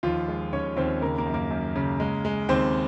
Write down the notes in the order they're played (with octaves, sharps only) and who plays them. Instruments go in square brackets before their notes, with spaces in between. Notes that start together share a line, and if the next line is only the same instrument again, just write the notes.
[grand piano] D#2 F3 F4
G#3
D#2 C#4 C#5
D#2 C4 C5
C#3 A#3 A#4
A#3 A#4
F#2
A#3 A#4
F#2
C#3
G#3
G#3
D#2 C4 C5